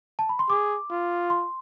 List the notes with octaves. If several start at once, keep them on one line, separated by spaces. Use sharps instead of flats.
A5
B5
C6
G#4 D6
F4
C6